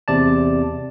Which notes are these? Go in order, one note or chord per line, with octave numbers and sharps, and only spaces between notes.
E2 C3 D5 A5